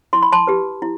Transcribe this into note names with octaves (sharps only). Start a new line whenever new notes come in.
E4 C6
B5
A5 C6
G4 B4
E4